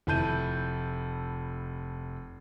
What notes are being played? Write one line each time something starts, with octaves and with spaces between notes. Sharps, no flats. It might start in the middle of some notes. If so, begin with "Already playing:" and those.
F1 E4 A5 G6 D#7